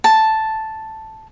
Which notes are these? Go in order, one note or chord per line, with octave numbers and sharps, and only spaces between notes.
A5